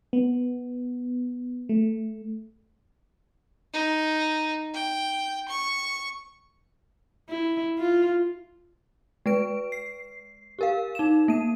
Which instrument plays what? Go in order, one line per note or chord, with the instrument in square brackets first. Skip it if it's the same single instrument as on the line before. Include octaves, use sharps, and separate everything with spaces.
[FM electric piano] B3
A3
[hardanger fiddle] D#4
G5
C#6
[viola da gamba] E4
F4
[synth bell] G#3 B4 D7
C7
G4 A#4 F5
D#4 E7
A#3 D#7